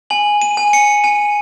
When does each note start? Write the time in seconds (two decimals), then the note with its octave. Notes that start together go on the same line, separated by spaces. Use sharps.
0.10 G#5 F#7
0.42 D#7
0.57 G#5
0.73 C#7
1.04 G#5 D#7